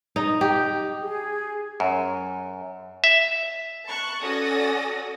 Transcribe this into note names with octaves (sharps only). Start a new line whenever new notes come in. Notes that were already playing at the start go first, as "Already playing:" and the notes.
D#4
G4
G#4
F#2
E5
A5 C#6 F#6
C#4 F#4 A4 D5 D#6 A#6